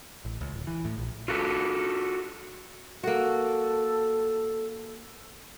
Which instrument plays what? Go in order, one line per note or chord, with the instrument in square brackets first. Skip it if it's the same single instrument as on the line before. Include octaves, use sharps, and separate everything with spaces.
[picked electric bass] A1
C#2
D1
E3
A2
A#1
[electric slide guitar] F4 F#4 A4
[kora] A#3 F#4 [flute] A4